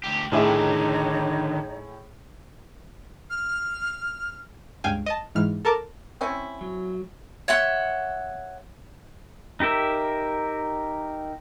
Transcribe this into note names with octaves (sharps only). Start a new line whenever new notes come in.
D2 G4
A2 D3 D#3 D#4 G#4 C#5 E5
F6
C#2 G2 F5 G5 G#5
D#5 A5
G#2 E3 F6
A4 A#4 A5 D6
C4 C#4 E4
F#3
C#5 E5 F#5 C6
D#4 G4 A#4 E5